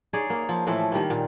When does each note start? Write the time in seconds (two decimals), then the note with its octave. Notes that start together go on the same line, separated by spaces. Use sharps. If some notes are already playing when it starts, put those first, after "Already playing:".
0.13 D#4 G#4 C#5 D5
0.30 A#3
0.49 F3
0.67 A2 E3 F3 A3
0.92 D#3 G3 A#3
1.10 A#2